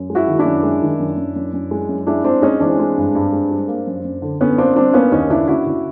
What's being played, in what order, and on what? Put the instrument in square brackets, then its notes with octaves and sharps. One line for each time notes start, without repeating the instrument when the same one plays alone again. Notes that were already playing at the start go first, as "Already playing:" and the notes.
Already playing: [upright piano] F#2
G#3
E4 F#4
D#3
D4 E4
F#2
G#3
D#3
F#2
F#2
F#2
F#2
G#3
F#2
G#3 D4 E4
G#3 C4 D4
G#3 C#4 D#4
E3 C4 D4
G#3
G2
G2
G#3
G3
A#3
F#2
F#2
D3
D3 B3 C#4
A#3 C4 D4
G3 C4 D4
A#3 B3 C#4
D#2 C#4 D#4
C#3 D4 E4
C#3 E4 F#4
C#3